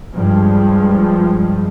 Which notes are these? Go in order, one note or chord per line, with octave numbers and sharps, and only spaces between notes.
G2 F3 G#3